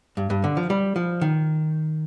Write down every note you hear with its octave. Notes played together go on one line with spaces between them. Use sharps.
G2
G2
D3
F3
G3
F3
D#3